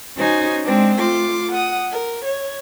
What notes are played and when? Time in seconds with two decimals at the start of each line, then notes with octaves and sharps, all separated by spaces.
0.17 C#4 D#4 F#4 C5 G#5
0.66 G#3 C4 D4
0.99 A3 F4 C6 D6
1.51 F#5 D#6
1.91 A#4
2.25 C#5